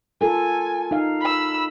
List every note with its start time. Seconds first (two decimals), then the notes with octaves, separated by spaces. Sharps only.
0.21 F4 A4 A#4 G#5
0.91 D#4 F5
1.21 B5 E6